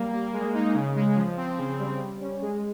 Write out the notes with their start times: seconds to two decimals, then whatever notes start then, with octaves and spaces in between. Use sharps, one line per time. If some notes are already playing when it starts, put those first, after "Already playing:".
Already playing: G3 A#3
0.12 A#3
0.33 G#3
0.54 D#4
0.75 C#3
0.96 G#3
1.16 F3
1.37 C4
1.58 C#3
1.79 G3
2.00 G3
2.21 C#4
2.42 G#3